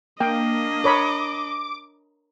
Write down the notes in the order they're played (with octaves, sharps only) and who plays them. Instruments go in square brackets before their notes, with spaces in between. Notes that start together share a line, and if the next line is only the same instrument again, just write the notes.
[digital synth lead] A#3 [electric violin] D4 D#5 [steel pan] G5
[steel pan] A#4 C#5 B5 [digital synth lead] D6